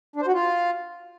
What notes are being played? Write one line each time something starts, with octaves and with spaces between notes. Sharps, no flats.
D4
C5
F#4
F4